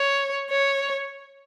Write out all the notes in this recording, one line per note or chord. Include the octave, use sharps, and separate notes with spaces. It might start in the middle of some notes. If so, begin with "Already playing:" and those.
Already playing: C#5
C#5